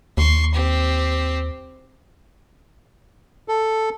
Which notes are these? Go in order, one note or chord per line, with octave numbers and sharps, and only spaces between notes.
D#2 C6 C#6
C4 G4
A4